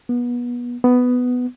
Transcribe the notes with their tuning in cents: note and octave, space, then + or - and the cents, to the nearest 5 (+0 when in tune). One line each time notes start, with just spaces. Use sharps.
B3 -25
B3 +10